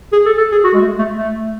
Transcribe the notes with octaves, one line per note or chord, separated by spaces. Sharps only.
G#4
A4
A4
G#4
F#4
G#3
A3
A3
A3